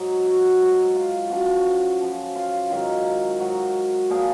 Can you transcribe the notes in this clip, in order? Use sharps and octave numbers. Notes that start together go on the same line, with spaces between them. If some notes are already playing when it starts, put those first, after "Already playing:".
Already playing: G#2 F#3
F#4
G#2 F#3
F4
F#2 F3 F#4
F#2 C#3 F3
F4
G#2 D#3 F#3 F4
G#2 F#3 F#4
A#2 F3 G#4